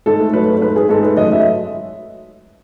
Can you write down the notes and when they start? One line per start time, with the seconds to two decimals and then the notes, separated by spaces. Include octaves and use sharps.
0.06 G#2 A4
0.19 A3
0.33 F#3 B4
0.48 G#2
0.61 G#2 B4
0.76 G#2 G#4
0.89 G#2 A4
1.03 A3 B4
1.17 F#2 D#5
1.32 F#3 E5